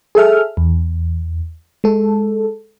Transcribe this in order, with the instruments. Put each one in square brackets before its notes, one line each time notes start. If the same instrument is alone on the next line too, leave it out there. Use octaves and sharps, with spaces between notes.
[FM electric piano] G#4 A4 E5 F6
E2
G#3 A4